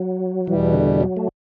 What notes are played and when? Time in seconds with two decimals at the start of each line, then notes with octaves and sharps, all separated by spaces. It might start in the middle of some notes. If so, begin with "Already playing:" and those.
Already playing: F#3
0.47 E2 B2 E3 G3
0.74 D3
1.01 F#3
1.17 A3